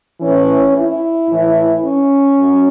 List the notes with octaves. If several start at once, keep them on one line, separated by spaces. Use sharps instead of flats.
A2 E3 C#4
E4
A2 E3
C#4
F#2